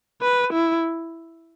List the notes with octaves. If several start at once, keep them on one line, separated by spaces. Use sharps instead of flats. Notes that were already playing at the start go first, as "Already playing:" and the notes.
B4
E4